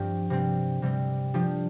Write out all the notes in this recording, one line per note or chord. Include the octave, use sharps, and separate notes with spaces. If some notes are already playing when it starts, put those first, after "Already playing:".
Already playing: G2 F3 C4 G4
C3 G3 C4
C3 G3 C4
F3 D4 G4